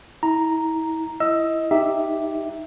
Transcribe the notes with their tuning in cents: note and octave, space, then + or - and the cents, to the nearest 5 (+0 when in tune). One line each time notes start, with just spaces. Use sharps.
E4 -35 A#5 +0
E4 +10 D#5 +25 E6 +15
D#4 +0 G4 +0 E5 +0